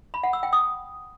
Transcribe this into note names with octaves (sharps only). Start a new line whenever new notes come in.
B5
F#5
E6
G5
D#6